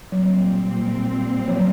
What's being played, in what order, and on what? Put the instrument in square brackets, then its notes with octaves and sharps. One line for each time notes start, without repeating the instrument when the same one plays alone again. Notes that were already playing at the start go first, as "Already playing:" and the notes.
[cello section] A#2 G3 C4 [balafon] F#3
[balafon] F3
F#3